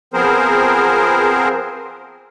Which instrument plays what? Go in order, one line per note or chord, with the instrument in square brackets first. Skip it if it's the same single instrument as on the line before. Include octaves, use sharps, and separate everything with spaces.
[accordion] F3 B3 C4 G#4 A#4 C5